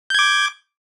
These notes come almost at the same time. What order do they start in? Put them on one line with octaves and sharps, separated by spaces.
G6 G#6 D6